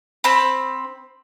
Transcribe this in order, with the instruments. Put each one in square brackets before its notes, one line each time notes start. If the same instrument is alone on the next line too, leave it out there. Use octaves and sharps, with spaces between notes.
[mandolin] C4 B5